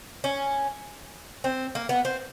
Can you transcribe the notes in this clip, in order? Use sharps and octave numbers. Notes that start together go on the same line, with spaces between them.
C#4
C4
A#3
B3
C4